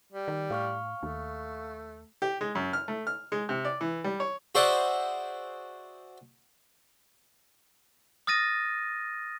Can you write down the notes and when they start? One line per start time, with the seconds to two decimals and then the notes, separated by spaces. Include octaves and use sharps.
0.12 G3
0.28 D#3
0.50 A2 F5 C#6 F6
1.03 D#2 A3
2.22 G4
2.41 G#3
2.55 F#2
2.73 F6
2.88 A3
3.07 F6
3.32 G#3
3.49 C3
3.65 D5
3.81 E3
4.04 G3
4.20 C#5
4.55 F#4 G#4 C5 D5 E5 F#5
8.27 D#6 F6 A6 A#6 D#7